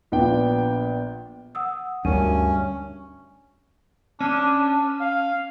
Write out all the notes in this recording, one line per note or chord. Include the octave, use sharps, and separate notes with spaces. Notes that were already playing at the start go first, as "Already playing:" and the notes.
A#1 B3 D4 F4 G5
F#5 D#6 E6
D2 G2 C#4 A#4 D#7
C#4 D4
F5